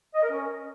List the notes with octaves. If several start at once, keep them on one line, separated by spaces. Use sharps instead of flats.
D#5
A#4
C#4